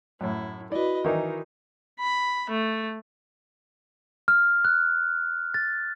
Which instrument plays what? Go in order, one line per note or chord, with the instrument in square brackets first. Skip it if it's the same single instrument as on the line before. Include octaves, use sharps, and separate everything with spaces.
[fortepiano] F#2 A2 [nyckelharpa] E4
[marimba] E4 F#4 [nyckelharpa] B4 D#5 [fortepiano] D5
[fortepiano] D#3 E3 D#4 [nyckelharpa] A#4 [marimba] D5
[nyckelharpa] B5
A3
[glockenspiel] F6
F#6
A6